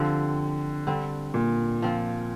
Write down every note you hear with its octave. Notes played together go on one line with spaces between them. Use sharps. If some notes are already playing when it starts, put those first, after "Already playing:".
Already playing: D3 F3 C4 G4
D3 G3 C4
A#2
F3 C4 F4